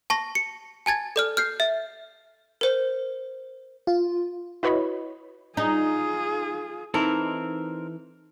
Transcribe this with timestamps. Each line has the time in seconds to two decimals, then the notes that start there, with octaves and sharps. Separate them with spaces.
0.10 A5 C#6 A#6
0.35 C#7
0.86 G#5 A5 G#6 A6
1.16 A4 D5 F6
1.37 F6 G6 C7
1.60 E5
2.61 A#4 C5
3.87 F4
4.63 E4 F#4 B4 C#5 D#5 B5
5.57 D#4 F4 G#4
6.94 E3 C4 D#4 E4 A4 A#4